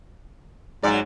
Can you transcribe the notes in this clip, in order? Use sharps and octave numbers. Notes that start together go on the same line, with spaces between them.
G#2 F#3 D5